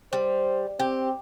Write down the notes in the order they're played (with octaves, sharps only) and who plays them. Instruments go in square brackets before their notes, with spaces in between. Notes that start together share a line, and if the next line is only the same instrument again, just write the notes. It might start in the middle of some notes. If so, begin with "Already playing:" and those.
[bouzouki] G3 [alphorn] C5
[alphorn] C4 [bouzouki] G4